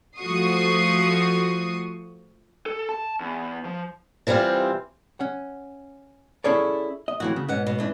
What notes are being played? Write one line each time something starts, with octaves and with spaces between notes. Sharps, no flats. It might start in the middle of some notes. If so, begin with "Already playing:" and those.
F3 A3 F#4 C#6 D#6 C7
A4
A5
E2
F3
C3 E3 G3 C4 F4
C#4 F#5
C#4 E4 G#4 A4 C#5 D5
D#5
F2 A2 E3 F#4
C#3
G#2 B2 C#4 F#5
B2
D#2 E3 D4